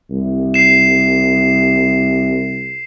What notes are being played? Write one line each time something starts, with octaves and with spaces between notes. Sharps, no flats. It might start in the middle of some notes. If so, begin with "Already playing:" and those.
C2
C7 E7